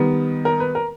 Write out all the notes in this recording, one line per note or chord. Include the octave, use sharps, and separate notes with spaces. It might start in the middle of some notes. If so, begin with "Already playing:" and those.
Already playing: D#3 G3 B3
A#4
B4
A#4